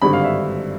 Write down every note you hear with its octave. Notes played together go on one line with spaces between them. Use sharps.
G#1 G2 D3 B5
F5
E5